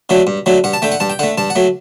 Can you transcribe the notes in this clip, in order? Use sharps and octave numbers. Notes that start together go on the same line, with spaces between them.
D3 F#3 A3
G2
D3 F#3 A3
G2 F#5
A5
D3 A3 G5
F#5
G2 A5
G5
D3 A3 F#5
G2 A5
F#5
F#3 A3